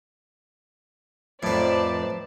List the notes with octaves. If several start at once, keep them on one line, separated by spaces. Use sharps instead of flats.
F2 A2 D#3 F3 B4 C5 D5 A5